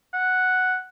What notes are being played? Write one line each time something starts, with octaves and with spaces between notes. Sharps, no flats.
F#5